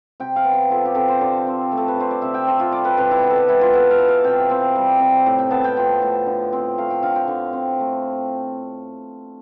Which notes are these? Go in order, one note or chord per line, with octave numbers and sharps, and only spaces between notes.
C3 G5
F5
B3
G5
F3 A4
G4
C3 A4
C5
D3 D5
C4
A3
A4
B4
D3 C5
D5
C3 E5
G5
C4 A4
F4
G3 D5
B4
C3 B4
E4
B3
A4
G4
E3 E4
F4
B3 A4
F5
E3
F5
C3 G5
C4
G3
C3
A2
G5
B3 A5
G5
F3 G5
A2
D3
C4
A3 F5
G5
D3 F5
G5
D3
C4
A3